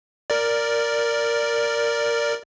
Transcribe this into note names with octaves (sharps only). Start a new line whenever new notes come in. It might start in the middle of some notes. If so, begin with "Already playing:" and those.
A#4 D5